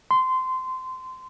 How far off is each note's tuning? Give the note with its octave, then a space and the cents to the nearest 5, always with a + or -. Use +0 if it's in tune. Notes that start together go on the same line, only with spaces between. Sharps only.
C6 -20